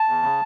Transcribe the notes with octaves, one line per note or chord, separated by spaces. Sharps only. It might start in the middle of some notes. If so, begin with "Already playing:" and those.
Already playing: A5
E2
C#3